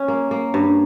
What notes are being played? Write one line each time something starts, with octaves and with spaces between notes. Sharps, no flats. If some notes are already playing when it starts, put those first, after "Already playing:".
Already playing: C#4
A#3
A#3
G2